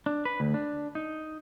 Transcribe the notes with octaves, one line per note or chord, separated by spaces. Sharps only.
D4
B4
D2
D4
D#4